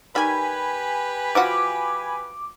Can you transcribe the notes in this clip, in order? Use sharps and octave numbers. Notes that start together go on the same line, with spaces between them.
D#3 G3 G4 B4 G#5 B5
F3 F4 F#4 D6